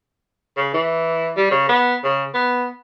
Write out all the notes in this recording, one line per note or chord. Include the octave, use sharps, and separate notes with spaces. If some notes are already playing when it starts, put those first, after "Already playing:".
C#3
E3
G3
C#3
B3
C#3
B3